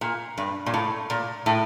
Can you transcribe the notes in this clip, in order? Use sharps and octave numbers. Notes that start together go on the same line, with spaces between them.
A#2
G2
A#2
A2
A#2
A2